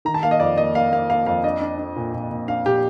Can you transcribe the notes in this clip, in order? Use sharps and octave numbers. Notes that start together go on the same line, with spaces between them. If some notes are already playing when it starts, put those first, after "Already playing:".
D#3 A#5
A5
A#3 F5
D#5
F2 D5
A#3 D#5
A#3 F5
A#3 F5
A#3 F5
F2 F5
D4 D#5
D4
D4
A#2
A#2
A#2
D4 F5
A#2 G4